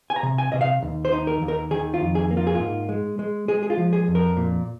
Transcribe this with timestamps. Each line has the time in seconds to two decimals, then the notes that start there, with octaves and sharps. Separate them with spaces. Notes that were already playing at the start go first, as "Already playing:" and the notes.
0.10 G#5
0.16 A#5
0.23 C3
0.38 G#5
0.52 C3 D#5
0.61 F5
0.82 D#2
1.05 C5
1.12 D#4
1.27 A#4
1.42 D#2
1.48 A#4
1.71 D#3 G#4
1.94 F4
2.01 F2
2.15 G#4
2.31 A#3
2.37 F4
2.47 G#4
2.55 G#2 F4
2.89 G#3
3.19 G#3
3.48 G#3 G#4
3.63 G#4
3.70 F4
3.78 F3
3.93 G#4
4.08 F2
4.15 A#4
4.37 A#2